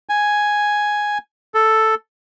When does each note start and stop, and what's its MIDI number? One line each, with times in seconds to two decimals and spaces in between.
0.09 1.18 80
1.55 1.95 69